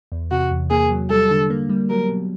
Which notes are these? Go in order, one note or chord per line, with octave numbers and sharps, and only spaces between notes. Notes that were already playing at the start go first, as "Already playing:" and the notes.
E2
C3 F#4
E2
A#3 G#4
F#3
G3 A4
D3
A#3
G3
F#3 A#4
B2